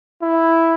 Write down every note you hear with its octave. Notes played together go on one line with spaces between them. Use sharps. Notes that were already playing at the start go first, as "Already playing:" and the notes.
E4